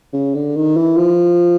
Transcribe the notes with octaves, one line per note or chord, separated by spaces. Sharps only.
C#3
D3
D#3
E3
F3